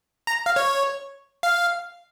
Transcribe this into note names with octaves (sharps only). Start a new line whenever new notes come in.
A#5
F5
C#5
F5